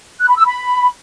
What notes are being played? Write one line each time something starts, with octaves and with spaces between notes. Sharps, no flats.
F#6
B5
E6
B5